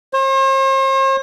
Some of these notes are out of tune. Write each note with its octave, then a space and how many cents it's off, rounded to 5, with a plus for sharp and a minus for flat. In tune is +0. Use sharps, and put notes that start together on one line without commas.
C5 +45